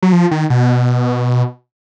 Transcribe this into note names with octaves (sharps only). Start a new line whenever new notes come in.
F#3
F3
D#3
B2